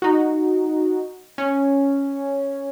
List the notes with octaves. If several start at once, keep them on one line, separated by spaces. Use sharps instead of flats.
D#4 F#4
C#4